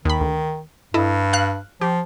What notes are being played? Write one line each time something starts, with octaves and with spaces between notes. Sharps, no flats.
D#2 D#3 B5
D2
G2 E4 A4 D#5
F5 F#6
F3 G4